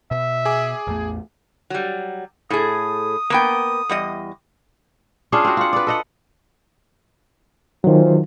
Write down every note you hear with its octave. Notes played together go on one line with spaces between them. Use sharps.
B2 E5
G#4 G#5 D6
A1 E2 A3
F#3 G3
A2 G#4 D#6
A#3 B3 G5
E2 G3 D#5
C#4 D4 F4 G#4
C4 F#4
F4 F#5
B4 D5
A4 D#5 F#5
E2 D#3 F#3 F4 C5